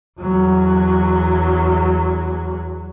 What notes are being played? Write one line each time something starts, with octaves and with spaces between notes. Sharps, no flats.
E2 F#3